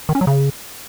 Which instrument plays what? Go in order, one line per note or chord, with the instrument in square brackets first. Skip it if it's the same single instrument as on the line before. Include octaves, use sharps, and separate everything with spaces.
[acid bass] D#3
C#4
F#3
C#3